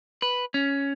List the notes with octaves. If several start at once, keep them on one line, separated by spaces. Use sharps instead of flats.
B4
C#4